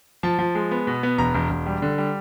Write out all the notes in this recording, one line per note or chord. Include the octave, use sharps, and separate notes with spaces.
F3 A5
F3
G#3
B3
B2
B3
E1 A#5
E1
E1
G3
D3
G3